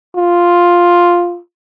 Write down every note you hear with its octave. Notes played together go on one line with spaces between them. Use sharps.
F4